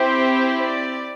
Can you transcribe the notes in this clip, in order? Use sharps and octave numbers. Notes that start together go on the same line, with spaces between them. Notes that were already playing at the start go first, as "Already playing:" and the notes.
Already playing: C4 E4 G4 C5
D5